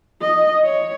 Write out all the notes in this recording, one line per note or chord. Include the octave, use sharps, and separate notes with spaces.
D#5
C#5